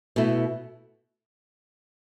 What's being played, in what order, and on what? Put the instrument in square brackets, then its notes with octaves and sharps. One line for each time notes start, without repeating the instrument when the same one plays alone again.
[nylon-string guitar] B2 A3 E4